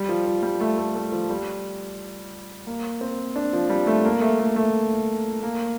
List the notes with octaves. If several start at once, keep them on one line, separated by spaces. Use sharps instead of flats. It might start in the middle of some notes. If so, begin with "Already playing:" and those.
Already playing: G3
F3
F3
G3
A3
A3
A3
F3
G3
A#3
C4
D4
F3
G3
A3
A#3
A3
A3
A3
A#3